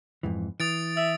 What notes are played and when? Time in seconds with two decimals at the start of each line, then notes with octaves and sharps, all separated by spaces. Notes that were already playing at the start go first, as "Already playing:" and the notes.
0.23 F2 G#2 E3
0.60 E3 D#6 A6 D7
0.97 E5 E6